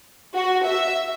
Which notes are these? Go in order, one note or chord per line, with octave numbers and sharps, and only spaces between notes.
F#4
E5